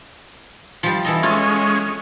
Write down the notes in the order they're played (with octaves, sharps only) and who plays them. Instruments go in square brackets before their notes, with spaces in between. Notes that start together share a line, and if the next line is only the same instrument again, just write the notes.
[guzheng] F3 G3
E3 A4 D#5
[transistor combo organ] G#3 C#4 [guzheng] F4